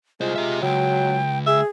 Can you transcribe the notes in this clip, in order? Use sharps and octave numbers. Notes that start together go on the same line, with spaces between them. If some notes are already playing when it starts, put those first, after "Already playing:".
C2 G#3 F4 C5
G4 E5
C#2 F#3 G5
G#4 E5